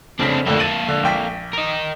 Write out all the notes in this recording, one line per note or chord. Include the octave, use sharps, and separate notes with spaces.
F1 C#3 C4 D4 B6
F2 A2 D3 A#3 A4
A6 D#7 F#7
D3
A#1 G5 B6
A#4 D#5